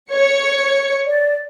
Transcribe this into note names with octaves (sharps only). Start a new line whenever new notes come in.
C#5 C#7
D5